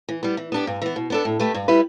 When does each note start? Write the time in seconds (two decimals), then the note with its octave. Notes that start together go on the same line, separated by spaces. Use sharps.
0.09 E3
0.23 G3 B3
0.37 E3
0.52 B3 D4 G4
0.67 G2
0.82 E3 B3
0.96 B2
1.10 B3 D4 A4
1.25 A2
1.40 A3 G4 B4
1.54 G2
1.68 G3 E4 B4